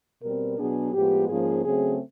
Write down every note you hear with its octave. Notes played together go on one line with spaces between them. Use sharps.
B2 G3 C4 A#4
B2 F#3 B3 D4 G#4
A2 F3 G#3 B3 G4
G#2 F3 A#3 C#4 G#4
C#3 F#3 A3 C4 G#4